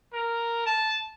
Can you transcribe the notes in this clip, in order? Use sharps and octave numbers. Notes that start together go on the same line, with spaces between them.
A#4
A5